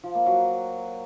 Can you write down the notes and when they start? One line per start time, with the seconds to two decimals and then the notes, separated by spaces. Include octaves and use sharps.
0.04 F3
0.15 A#3
0.26 F#3